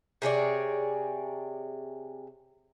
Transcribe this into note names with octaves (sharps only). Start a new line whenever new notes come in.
C3 G#4 C#5 D5